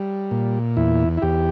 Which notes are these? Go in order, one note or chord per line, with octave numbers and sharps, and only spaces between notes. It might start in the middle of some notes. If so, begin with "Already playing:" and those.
Already playing: G3
A#2
E2 E4
E4
E2 G4